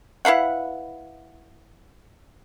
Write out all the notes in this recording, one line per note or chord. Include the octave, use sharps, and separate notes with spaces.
E4 B4 F5 F#5